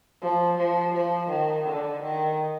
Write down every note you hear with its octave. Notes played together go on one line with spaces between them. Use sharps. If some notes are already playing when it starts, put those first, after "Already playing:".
F3
F3
F3
D#3
D3
D#3